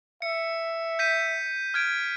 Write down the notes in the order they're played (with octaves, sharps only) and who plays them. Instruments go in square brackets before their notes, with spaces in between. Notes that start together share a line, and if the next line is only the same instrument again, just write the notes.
[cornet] E5 [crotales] C#7
[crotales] G6 B6 D#7
F6 G#6 D7